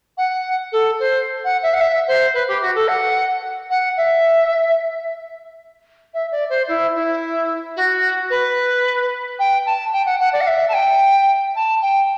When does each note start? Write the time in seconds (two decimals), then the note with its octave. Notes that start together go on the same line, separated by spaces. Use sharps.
0.17 F#5
0.72 A4
0.99 C5
1.44 F#5
1.62 E5
1.73 F#5
1.80 E5
2.07 C5
2.34 B4
2.48 G4
2.61 F#4
2.75 A4
2.88 F#5
3.70 F#5
3.97 E5
6.13 E5
6.31 D5
6.49 C5
6.67 E4
6.94 E4
7.76 F#4
8.30 B4
9.39 G5
9.65 A5
9.92 G5
10.05 F#5
10.20 F#5
10.33 D5
10.40 F#5
10.46 E5
10.68 A5
10.73 G5
11.55 A5
11.82 G5